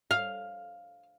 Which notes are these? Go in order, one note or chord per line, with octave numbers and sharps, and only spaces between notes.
F5